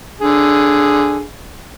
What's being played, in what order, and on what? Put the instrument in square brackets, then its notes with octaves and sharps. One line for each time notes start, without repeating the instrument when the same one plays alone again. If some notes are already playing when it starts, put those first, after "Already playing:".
[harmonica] D3 G#4